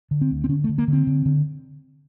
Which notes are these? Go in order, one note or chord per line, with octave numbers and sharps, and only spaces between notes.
D3
C4
D2
C4
D3 C#4
A3
D3
A#3
D3
C4
D3
D3